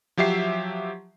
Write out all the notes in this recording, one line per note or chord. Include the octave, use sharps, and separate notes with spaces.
F3 F#3 G4 E5 C7